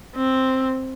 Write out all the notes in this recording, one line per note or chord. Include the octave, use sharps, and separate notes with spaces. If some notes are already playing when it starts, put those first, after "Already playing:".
C4